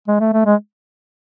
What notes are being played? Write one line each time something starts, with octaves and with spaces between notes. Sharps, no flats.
G#3
A3
A3
G#3